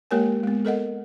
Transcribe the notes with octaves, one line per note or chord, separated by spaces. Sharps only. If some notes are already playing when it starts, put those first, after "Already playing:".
G#3 A#3 G4 A#4 C#5 G#5
G#3 B3
A4 A#4 D#5 F#5